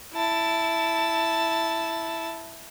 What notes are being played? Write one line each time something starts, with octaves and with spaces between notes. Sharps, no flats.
E4 A5